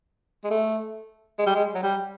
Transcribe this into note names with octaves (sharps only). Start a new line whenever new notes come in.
G#3
A3
G#3
G3
G#3
F#3
G3